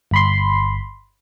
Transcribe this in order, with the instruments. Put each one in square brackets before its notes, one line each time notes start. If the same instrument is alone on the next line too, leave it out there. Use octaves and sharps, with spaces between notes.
[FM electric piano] G1 B5 C6